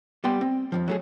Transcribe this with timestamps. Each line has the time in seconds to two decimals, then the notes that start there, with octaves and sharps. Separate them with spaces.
0.24 G3 B3 G5 C6
0.41 C4
0.72 F2 A2 F3
0.88 F#3 A3 G#4